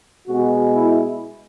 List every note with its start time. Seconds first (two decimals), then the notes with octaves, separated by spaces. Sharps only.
0.27 B2 G#3 F#4
0.75 E4